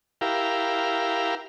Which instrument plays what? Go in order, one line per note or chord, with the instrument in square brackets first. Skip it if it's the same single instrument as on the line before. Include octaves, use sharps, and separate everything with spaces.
[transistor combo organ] E4 G4 A#4 F5